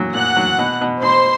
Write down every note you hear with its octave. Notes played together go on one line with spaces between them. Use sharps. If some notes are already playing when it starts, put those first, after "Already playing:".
Already playing: A#2 F#3
A#2 F#5 F#6
F#3
B2
B2
B2 C5 C6